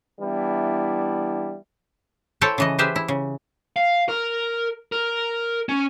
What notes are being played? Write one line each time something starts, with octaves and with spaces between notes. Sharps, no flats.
E3 G3 B3 D4 E4
E4 A4 C5 C#5 G5 A5
C#3 E3 D#5
G4 G#4 B4 C5 E5
E4
C#3
F5
A#4
A#4
C#4